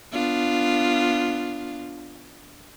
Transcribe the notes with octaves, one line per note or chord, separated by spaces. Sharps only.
B3 D4 F4